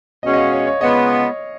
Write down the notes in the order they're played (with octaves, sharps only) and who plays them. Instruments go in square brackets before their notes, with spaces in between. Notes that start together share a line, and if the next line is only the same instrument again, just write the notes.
[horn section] B2 G#3 C#4 F#4 [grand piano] D#5
[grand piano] D#5
F5
C#5
C#5
[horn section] C#3 G#3 B3 F4 [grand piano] D#5